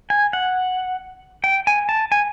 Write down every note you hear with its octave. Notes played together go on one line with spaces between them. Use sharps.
G#5
F#5
G5
G#5
A5
G#5